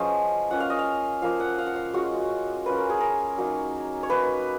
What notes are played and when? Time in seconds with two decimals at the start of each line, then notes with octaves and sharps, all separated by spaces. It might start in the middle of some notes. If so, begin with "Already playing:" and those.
Already playing: F3 G#3 C#4 F4 B4 D#5
0.51 A#3 C#4 F4 F#5
0.60 F5
0.70 D#5
0.79 F5
1.22 F3 A#3 F4 F5
1.40 F#5
1.58 F5
1.67 F#5
1.76 F5
1.94 G#3 C#4 F4 F#4
2.66 A#3 C#4 F4 B4
2.78 A#4
2.90 G#4
3.01 A#4
3.37 F#3 A#3 D#4
4.03 C#5
4.09 A#3 D#4 B4